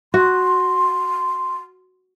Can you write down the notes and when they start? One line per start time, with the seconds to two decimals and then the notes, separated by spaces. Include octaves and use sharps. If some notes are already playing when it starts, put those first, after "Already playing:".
0.14 F#4 C6